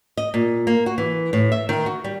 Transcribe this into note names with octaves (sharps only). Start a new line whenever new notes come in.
D#5
A#2
A#3
F#4
E3
A2
E5
D#3
F#4
G3